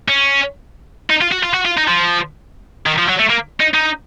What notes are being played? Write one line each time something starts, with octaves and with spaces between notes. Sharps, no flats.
C#4
D#4
F4
F#4
F4
F#4
F4
D#4
F3
D#3
F3
F#3
A3
A#3
D#4
D#4